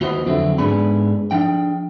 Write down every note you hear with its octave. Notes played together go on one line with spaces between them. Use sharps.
D#2 F4 F#4 B4 C5 D#5
F2 D3 F#3 C4 E4
G#2 B3 D4 G#4 B5
F3 D4 G5